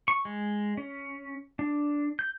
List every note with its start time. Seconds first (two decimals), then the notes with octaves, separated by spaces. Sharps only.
0.08 C#6
0.25 G#3
0.77 C#4
1.59 D4
2.19 G6